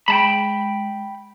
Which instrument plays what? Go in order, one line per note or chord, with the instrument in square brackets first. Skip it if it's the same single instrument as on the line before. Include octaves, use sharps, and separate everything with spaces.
[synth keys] G#3 [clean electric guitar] G5 A5 B5